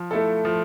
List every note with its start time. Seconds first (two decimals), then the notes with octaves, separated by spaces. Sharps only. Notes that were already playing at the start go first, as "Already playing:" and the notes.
Already playing: F3
0.11 A3 E4 A4
0.45 F3